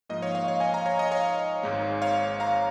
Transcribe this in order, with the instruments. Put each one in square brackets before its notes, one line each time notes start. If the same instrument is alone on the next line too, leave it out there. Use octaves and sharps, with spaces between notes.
[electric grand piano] G#2 F3 A#3 D#5
C#5 F5
C#5 F5
C#5 F5
D#5 G#5
F5 A#5
C#5
D#5
C#5 F5
G#1 G#2 G#3
C#5 F5
F5 A#5